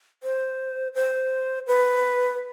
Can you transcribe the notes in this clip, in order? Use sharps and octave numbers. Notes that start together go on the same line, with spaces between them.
C5
C5
B4